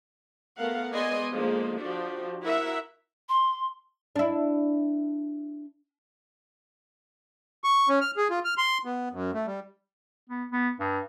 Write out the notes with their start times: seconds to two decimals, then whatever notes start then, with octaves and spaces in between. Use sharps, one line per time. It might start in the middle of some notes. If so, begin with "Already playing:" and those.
0.57 A3 B3 A#4 F5 F#5
0.93 G#3 B3 D5 D#5 G#5 C6
1.32 D3 F3 G#3 A#3 D#4
1.78 F3 D4 F#4 G4
2.43 E4 F#4 A#4 E5 F#5
3.29 C6
4.16 D4 E4
7.64 C#6
7.89 C#4
8.01 F6
8.17 G#4
8.30 F4
8.45 F6
8.58 C6
8.85 B3
9.12 F#2
9.34 A3
9.46 G3
10.30 B3
10.52 B3
10.80 G2